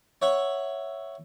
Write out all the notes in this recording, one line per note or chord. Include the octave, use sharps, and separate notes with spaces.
C#5 E5 F#5 C#6